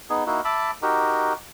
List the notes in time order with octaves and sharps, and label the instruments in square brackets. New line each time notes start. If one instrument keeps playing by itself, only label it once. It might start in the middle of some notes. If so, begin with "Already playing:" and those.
[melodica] B3 D#4 G#4
A#3 D#4 E4 F#4
E5 A5 B5 D6
D#4 F#4 G4 A#4